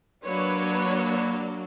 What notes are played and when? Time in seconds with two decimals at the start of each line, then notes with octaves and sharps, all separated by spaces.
0.23 F#3 A#3 D4 B4 C#5